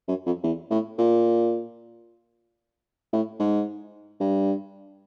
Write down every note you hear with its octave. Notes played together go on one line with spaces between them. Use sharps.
F#2
F2
E2
A2
A#2
A2
G#2
G2